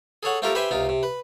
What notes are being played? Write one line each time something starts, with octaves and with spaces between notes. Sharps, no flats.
G#4 A4 C#5 F#5
A3 C4 F4 G4 A4 A#4
G4 B4 C5 E5 G5 G#5
C#2 C3 D#4 F4
C3
B4